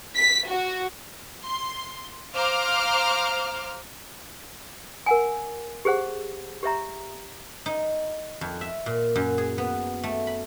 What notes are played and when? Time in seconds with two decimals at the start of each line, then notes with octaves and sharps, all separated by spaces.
0.16 B6
0.47 F#4
1.44 C6
2.34 C5 F5 A#5 D6 F6
5.06 A#4 F#5 G#5
5.85 G4 G#4 C5 F#5
6.63 G4 C#5 E5 A#5
7.66 D#4
8.41 F2
8.61 E5
8.86 A#2
9.15 F#2
9.38 G#4
9.58 B3
10.03 A3
10.27 B5